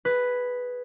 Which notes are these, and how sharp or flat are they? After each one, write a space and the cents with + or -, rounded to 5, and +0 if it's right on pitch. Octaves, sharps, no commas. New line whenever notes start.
G#4 +0 B4 +0